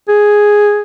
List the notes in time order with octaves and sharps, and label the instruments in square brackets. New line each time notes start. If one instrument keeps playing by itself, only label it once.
[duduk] G#4